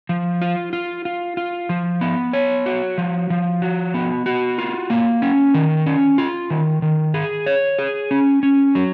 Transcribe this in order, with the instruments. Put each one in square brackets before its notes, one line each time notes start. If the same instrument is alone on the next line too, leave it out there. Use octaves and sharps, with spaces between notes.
[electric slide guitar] F3
F4
F4
F4
F4
F3
B3
C#5
F#4
F3
F3
F#4
B3
F#4
F4
A#3
C#4
D#3
C#4
F4
D#3
D#3
G#4
C#5
G#4
C#4
C#4
F#3